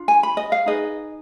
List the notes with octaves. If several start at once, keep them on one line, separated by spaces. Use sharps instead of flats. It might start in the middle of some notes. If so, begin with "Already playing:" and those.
Already playing: D4 F4
G#5
B5
D#5
F5
D#4 G#4 B4 D#5